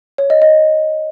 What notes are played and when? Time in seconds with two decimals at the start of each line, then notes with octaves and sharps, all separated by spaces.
0.18 C#5
0.30 D#5
0.42 D#5